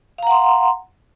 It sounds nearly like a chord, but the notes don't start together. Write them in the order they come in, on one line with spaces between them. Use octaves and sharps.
F5 A#5 F#5 C6